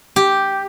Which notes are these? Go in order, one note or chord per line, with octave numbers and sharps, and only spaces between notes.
G4